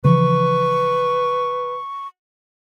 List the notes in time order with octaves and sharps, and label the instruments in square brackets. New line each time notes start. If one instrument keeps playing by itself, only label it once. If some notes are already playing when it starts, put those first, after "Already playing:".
[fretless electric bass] C#3 E3 F3 [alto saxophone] B4 [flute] C#6